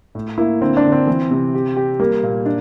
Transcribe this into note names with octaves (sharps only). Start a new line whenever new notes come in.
A2
A#3 E4
D3 C4
D4
D3
C4
E3
C3
G4
G4
G3 A#3
A#2
D4